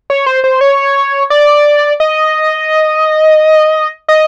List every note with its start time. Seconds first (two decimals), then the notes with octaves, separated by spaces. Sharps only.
0.10 C#5
0.26 C5
0.44 C5
0.61 C#5
1.30 D5
2.00 D#5
4.08 D#5